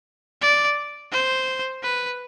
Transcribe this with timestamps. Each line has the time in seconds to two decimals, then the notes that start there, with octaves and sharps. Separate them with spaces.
0.42 D5
1.12 C5
1.83 B4